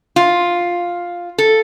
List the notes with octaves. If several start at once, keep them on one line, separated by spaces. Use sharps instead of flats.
F4
A4